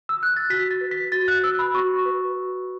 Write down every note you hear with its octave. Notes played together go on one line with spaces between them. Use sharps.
E6
F#6
A6
F#4 B6
A6
B4
B6
F#4 A6
F#6
B4 E6
B5
F#4 C#6
B4
F#4